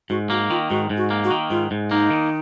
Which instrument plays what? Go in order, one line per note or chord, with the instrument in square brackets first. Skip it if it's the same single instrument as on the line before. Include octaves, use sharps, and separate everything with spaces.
[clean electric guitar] G#2 [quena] F#4
[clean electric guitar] A#3 [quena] F#4
[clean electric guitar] D#3 [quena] F4
[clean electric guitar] G#2 [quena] F#4
[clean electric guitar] G#2
[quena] F#4
[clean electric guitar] A#3
[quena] F#4
[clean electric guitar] D#3
[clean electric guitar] G#2 [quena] F4
[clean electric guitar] G#2
[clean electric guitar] A#3 [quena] D#4
[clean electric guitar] D#3